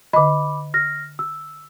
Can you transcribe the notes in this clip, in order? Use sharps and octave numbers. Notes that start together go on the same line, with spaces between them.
D3 D#5 B5 D6
F6 A#6
E6